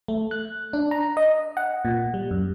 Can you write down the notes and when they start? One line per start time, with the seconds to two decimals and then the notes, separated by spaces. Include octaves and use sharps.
0.08 A3
0.31 F#6
0.73 D4
0.91 A#5
1.17 D#5
1.57 F#5
1.85 A#2
2.14 G3
2.31 F#2